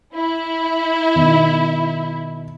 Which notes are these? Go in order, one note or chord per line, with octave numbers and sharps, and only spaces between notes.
E4
B2 D#3